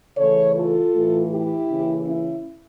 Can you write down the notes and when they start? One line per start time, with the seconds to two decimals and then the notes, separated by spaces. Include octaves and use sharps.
0.17 C#3 E3 A3 A4 C#5
0.55 F4 A4
0.94 A2 E3 A3
1.31 E4 G4
1.68 C#3 E3 A#3 C#4
2.06 C#4 E4